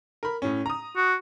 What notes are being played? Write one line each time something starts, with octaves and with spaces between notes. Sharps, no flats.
A#4 B5
A2 C#4
A#5 D#6
F#4